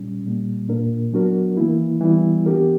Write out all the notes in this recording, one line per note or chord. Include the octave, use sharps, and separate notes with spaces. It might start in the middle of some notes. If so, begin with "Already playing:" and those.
Already playing: A#2 G3 C#4
A#2 G3 A#3
A#2 A#3 D4 A#4
F#3 B3 D4 F#4 A#4
E3 A#3 E4
E3 G3 B3 E4
E3 B3 D4 G4 A#4